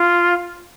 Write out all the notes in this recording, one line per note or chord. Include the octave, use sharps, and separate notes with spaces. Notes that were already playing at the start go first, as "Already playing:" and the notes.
Already playing: F4